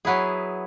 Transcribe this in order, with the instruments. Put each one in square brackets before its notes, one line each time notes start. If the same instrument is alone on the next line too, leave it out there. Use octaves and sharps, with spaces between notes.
[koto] F#3 B3 E4 G#4